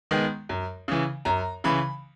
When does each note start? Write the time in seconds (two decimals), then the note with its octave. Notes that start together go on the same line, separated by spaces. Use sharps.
0.11 D#3 G#3 B3
0.49 F#2
0.88 C#3 E3
1.25 F#2 A#5
1.64 C#3 E3 B5